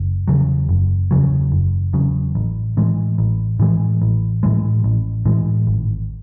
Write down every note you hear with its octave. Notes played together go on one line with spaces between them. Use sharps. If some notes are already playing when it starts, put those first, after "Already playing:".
Already playing: F#1
E2 C#3 F#3
F#1
E2 C#3 F#3
F#1
E2 C#3 F#3
A1
A2 E3 G#3
A1
A2 E3 G#3
A1
A2 E3 G#3
A1
A2 E3 G#3
G#1